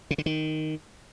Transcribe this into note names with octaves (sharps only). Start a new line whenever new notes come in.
C#3
D3
D#3